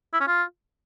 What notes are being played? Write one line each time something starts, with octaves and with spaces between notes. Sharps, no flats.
E4
C#4
F4